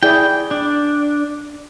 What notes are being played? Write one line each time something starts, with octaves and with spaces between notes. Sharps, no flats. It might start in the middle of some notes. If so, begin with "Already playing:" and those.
E4 G#4 D5 G5
D4